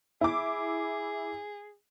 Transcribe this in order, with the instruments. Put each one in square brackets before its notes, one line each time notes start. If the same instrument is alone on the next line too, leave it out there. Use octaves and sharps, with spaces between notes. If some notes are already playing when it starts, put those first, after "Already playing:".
[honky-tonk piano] E4 D6 [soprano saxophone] G#4